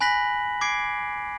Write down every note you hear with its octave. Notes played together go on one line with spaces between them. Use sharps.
G#5 B5 F#6 A#6 B6 F#7
D6 G#6 C7 D7